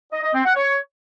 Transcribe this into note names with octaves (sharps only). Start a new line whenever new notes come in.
D#5
D#5
C4
F#5
C#5